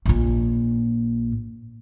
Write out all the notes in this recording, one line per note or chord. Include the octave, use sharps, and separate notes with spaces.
A#1 A#2